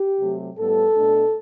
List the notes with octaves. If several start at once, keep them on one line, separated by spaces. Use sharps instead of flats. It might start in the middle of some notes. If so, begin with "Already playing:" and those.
Already playing: G4
C3 F#3 A3
A2 G3 B3 A4
B2 A3 D4